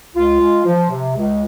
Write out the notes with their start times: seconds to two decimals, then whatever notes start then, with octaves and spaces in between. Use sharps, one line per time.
0.14 C#2 F4
0.40 G#3
0.65 F3
0.90 C3
1.16 C#2